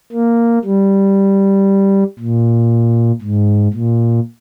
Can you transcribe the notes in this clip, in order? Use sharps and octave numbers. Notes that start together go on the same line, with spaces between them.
A#3
G3
A#2
G#2
A#2